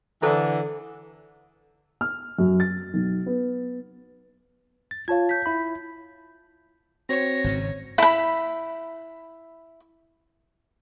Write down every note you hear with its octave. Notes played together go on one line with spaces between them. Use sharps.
D3 E3 E4 A4 C5
F6
F#2
A6
B1
B3
A6
F4 C#5 F5 A5 G#6
G6 B6
E4 B5
C4 F#4 C5 C#5 A#6
G#1 G#2 C#3
E4 B5